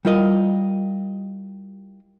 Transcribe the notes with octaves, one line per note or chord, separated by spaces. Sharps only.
G3 E4 F4 A#4 D#5